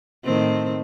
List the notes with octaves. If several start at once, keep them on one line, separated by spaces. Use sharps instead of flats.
A2 D#3 C4